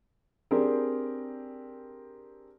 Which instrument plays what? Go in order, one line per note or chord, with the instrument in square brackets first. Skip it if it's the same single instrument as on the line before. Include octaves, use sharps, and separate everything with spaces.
[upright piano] C4 D4 G4 G#4 A#4